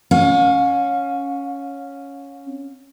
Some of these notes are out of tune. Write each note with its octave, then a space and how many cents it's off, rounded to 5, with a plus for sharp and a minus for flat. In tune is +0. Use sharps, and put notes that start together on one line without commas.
C#4 +0 F5 +40